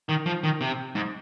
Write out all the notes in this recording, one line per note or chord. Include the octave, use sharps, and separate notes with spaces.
D#3
F3
D#3
C3
G#2